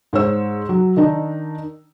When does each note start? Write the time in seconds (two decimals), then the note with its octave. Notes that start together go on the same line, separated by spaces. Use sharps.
0.13 G#2 C5 C#5 E6
0.69 F#3
0.97 D#3 D4 D#4